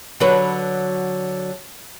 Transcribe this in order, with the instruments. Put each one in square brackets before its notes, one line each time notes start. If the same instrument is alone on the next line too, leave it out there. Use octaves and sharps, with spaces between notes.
[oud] D3 F#3 B4